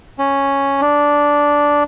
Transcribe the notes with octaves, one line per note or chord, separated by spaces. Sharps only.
C#4
D4